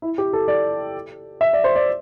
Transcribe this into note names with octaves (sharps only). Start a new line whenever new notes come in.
E4
G4
A4
D5
E5
D5
C5
D5